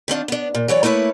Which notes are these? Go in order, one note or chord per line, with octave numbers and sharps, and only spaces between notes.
D#3 C4 D4 F4
B3 D4
A#2
E3 F#3 C#5 D5
A3 A#3 E4 B4 C#5